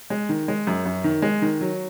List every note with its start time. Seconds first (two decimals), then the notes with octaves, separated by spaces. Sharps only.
0.10 G#3
0.29 D#3
0.48 G#3
0.67 F#2
0.85 F#2
1.04 D#3
1.22 G#3
1.42 D#3
1.61 F#3